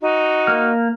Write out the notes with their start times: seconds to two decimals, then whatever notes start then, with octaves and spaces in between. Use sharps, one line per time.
0.01 D#4 F#4
0.47 A#3 F6